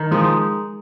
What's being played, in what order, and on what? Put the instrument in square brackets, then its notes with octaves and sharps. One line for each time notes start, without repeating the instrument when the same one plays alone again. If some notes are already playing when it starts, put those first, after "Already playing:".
Already playing: [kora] D#3
[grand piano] F3 [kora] G#3 D#4